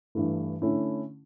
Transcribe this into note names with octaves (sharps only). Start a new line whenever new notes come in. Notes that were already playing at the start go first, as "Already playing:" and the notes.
G2 E3 A3 E4
D3 A3 C#4 E4